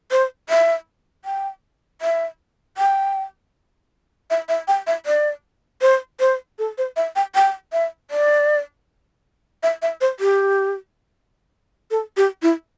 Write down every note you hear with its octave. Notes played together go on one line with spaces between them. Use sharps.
C5
E5
G5
E5
G5
E5
E5
G5
E5
D5
C5
C5
A4
C5
E5
G5
G5
E5
D5
E5
E5
C5
G4
A4
G4
E4